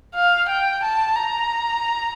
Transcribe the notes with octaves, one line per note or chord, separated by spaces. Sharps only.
F5
G5
A5
A#5